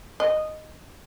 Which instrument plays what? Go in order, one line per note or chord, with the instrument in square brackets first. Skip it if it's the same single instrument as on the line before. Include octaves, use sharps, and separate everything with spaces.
[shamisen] D#5